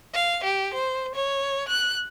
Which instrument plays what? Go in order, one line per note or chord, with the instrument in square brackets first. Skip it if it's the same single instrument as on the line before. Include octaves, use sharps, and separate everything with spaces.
[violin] F5
G4
C5
C#5
F#6